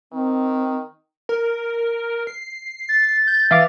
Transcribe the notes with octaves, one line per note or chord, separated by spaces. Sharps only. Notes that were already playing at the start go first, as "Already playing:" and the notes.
D#3 C4
A#4
C7
A6
G6
E3 E5 F5 D6